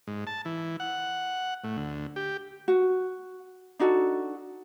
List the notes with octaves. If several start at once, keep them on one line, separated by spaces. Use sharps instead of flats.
G#2
A5
E3
F#5
A2
D2
G4
F#4
D4 D#4 F#4 A4